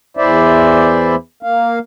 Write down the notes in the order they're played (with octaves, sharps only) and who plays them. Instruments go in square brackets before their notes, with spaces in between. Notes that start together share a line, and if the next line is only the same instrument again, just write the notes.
[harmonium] E2 E3 E4 C5 D5 E5
A#3 F5